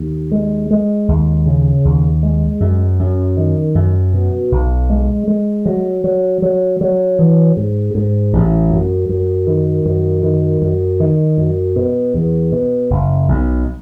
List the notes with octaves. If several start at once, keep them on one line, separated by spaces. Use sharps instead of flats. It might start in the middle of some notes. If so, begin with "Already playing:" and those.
Already playing: D#2
G#3
G#3
D#2
C#3
D#2
G#3
F#2
F#2
D#3
F#2
B2
B1
G#3
G#3
F#3
F#3
F#3
F#3
E3
G#2
G#2
A1
F#2
F#2
D#3
F#2
D#3
F#2
D#3
F#2
B2
E2
B2
F#1
B1